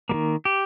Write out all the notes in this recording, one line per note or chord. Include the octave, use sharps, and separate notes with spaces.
D#3 G3 A#3
G4